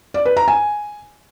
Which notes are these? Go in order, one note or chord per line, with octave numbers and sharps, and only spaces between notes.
D5
B4
A#5
G#5